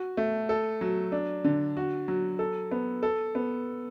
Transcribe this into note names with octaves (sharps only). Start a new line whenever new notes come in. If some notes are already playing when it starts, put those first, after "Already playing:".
Already playing: F#4
A3
A4
F#3
D4
D3
F#4
F#3
A4
B3
A4
B3